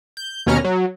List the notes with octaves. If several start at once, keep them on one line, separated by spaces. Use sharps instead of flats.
G6
D#2 B2 C#4 A#5 F6
F#3